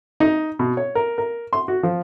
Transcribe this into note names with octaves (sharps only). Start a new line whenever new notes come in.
D#4
B2
C#5
A#4
A#4
C6
F#4
F3